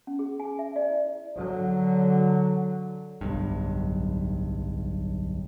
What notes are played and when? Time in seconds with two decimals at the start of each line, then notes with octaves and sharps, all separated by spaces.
0.07 C#4
0.19 G#4
0.40 G#5
0.59 E5
0.76 D5
0.90 E4
1.38 D3 F#3
3.21 D1 B1 G2